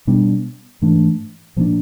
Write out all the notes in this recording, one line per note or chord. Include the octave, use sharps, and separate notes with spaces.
B2 G3 B3 D4
G#2 E3 A3 D4
A#2 F3 A#3 D4